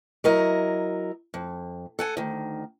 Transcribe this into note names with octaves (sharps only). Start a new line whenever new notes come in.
F#3 E4 A#4 D#5
F2
A4 F#5 G#5
D2 D#3